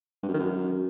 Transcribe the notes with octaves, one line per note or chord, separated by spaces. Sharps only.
G2
F#2
D#3
F#2